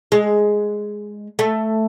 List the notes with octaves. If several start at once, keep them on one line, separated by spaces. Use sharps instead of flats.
G#3
A3